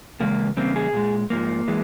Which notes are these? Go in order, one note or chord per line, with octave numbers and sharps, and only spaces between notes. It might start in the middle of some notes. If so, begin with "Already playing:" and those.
E2 C#3 G#3 A#3
E2 C#3 G3 A#3 C4
G#4
A#2 G#3
G#2 F3 A#3
E3 G#3